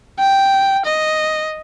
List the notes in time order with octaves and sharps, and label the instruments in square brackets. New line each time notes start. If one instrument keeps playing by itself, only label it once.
[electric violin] G5
D#5